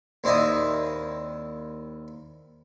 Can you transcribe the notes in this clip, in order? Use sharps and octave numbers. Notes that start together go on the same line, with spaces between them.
D#2 C4 D4 E4 D#5